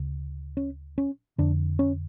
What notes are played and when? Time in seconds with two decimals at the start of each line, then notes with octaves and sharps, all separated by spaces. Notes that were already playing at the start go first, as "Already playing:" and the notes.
Already playing: D2 C#3
0.57 C#4
0.98 C#4
1.38 F2 D3 D4
1.79 C#4